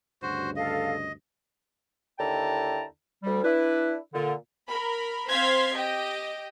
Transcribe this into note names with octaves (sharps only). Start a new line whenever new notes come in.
D2 G2 C#3 F#4 C5
A4 D#5 F5
D#2 D3 E4 G5 A5 A#5
D2 G3
D4 E4 B4
A#2 D3
A#4 B5
C4 C5 F5 C6 G#6 B6
G4 D#5 G5